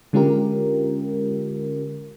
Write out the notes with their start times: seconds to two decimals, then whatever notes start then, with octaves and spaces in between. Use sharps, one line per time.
0.13 D3 G#3 C#4 F4 G4 A#4